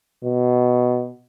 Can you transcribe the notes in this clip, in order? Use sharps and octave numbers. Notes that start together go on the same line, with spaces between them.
B2